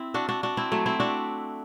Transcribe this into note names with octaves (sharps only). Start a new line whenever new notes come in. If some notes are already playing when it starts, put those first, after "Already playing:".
Already playing: C4 E4
D4 F#4
D4 F#4
D4 F#4
C4 E4
F#3 A3
C4 E4
D4 F#4